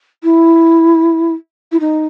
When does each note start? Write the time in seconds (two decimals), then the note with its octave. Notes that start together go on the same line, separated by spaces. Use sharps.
0.23 E4
1.72 E4
1.80 D#4